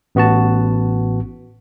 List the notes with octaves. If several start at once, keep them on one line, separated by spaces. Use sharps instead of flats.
A1 B3 F#4 A5